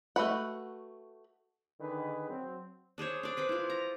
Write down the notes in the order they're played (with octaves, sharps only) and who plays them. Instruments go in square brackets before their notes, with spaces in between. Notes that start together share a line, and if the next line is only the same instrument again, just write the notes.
[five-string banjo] A3 F#4 B4 F#5
[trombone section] D3 D#3 G#4 B4
F#3 C4
[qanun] D4 G#4 C5 C#5
D4 D5
B4 C5 B5
E4 F4
A#5